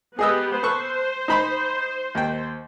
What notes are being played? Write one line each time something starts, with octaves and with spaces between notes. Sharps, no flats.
B3 G4 G#4 D#5 E6
A4 B4 C5 C#6
D#4 B5 C6
D#2 G5